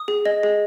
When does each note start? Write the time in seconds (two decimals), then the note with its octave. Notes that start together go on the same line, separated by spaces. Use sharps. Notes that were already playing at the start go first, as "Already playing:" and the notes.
Already playing: D#6
0.08 G#4
0.25 D#5
0.43 G#4